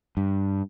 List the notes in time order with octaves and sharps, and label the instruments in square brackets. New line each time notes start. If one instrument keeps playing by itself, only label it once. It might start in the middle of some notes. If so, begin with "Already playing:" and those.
[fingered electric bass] G2